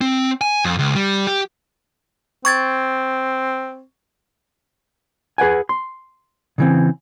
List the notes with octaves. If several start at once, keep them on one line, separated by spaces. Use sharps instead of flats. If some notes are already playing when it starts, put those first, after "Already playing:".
C4
G#5
F2
C#2
G3
G4
C4 C#6 G#6 A6
G#4 B4 F#5 G#5
C6
C#3 E3 C4